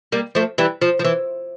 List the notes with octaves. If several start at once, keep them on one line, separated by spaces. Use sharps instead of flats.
G3 A#3
F3 A3
E3 G3
F3
F3
E3